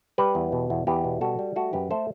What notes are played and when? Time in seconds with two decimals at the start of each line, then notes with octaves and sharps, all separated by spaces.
0.18 G3 G4 B4
0.35 E2
0.52 B2
0.70 E2
0.87 E2 G4 B4
1.04 B2
1.21 G3 F#4 A4
1.39 G3
1.56 A3 F#4 A4
1.73 F#2 G4 B4
1.91 A3 A4 C5